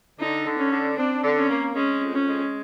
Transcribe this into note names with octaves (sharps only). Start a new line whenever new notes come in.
D3 D#4
D3
C#4
D3
C4 D4
D3
C#4
A#3
G#3 C#4
F2
C#4
G#3